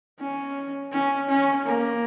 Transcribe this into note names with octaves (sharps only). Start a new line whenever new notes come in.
C#4
C#4
C#4
A#3